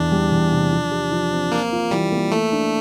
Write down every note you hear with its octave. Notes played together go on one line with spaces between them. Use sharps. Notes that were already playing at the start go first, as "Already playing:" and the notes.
Already playing: E2 E3 D4
G3
E2
C3
F3
G4
F3
C4
A#3 A#4
F4
E3 G3
A#3
A3 A4
D4